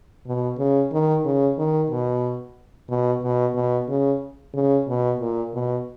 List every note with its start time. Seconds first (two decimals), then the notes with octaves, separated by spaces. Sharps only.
0.27 B2
0.59 C#3
0.92 D#3
1.25 C#3
1.58 D#3
1.90 B2
2.89 B2
3.23 B2
3.55 B2
3.89 C#3
4.54 C#3
4.88 B2
5.20 A#2
5.54 B2